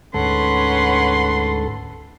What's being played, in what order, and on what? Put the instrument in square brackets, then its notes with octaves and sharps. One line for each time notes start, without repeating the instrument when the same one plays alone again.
[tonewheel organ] D2 G#2 A4 [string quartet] C#4 B4 F#5 [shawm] C6